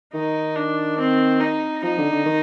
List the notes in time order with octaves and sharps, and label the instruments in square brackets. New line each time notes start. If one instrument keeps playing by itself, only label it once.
[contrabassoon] D#3 [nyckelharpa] D#4
[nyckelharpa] D4
C4
D#4
[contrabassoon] F3 [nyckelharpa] D#4
[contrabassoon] D3
D3
D#3